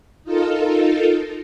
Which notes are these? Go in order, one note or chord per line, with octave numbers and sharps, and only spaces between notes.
D#4 F4 A4 A#4